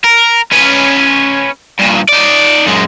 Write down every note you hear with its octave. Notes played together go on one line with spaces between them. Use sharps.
A#4
C#4 B4
G2 A#2
D#4 D5
F#2 G#3